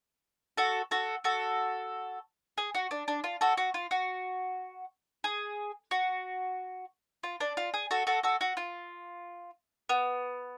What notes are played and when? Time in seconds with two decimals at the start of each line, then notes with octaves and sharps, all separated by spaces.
0.57 F#4 A4
0.91 F#4 A4
1.24 F#4 A4
2.58 G#4
2.74 F#4
2.91 D4
3.08 D4
3.24 F4
3.41 F#4 A4
3.57 F#4
3.74 F4
3.91 F#4
5.24 G#4
5.91 F#4
7.23 F4
7.40 D4
7.57 F4
7.74 G#4
7.91 F#4 A4
8.07 F#4 A4
8.23 F#4 A4
8.41 F#4
8.57 F4
9.89 B3